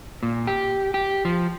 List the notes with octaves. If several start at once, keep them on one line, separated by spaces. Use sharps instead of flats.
A#2
G4
G4
F3